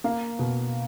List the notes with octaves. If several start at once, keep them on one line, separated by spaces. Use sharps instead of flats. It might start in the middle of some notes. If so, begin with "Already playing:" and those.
A#3 F5
B2